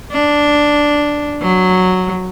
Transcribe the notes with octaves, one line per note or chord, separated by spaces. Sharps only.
D4
F#3